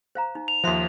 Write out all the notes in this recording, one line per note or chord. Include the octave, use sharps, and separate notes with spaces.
C5 F5 A#5
D#4
F7
D#2 F3 C5 E5 C6